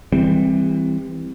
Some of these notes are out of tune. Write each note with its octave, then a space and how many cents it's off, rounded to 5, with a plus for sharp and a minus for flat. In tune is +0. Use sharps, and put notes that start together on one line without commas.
E3 +0 G3 +25 C4 +0